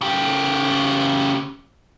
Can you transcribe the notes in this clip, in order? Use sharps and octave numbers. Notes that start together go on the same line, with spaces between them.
C#3 G4